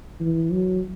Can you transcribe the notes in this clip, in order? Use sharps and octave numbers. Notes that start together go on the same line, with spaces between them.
E3
F#3